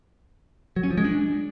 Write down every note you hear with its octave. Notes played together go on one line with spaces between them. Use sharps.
F#3
C#4
F3
G#3
D4